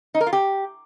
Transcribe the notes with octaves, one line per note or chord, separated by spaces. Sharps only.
D#4
A#4
F4
G4